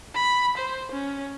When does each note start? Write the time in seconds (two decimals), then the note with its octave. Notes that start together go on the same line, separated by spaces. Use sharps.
0.15 B5
0.58 C5
0.92 C#4